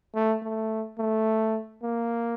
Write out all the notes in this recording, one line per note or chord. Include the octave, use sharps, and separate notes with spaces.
A3
A3
A3
A#3